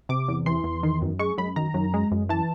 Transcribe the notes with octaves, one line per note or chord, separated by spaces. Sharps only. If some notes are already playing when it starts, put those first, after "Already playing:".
C3 D6
E2
E3 C6
E2
D#3
F#2
G#3 C#6
F#2 B5
D#3 A#5
F#2
G#3
F#2
E3 A5